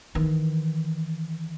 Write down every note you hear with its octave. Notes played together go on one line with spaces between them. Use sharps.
D#3 E3